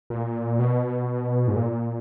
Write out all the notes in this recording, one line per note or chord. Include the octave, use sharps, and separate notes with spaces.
A#2
B2
G#2
A#2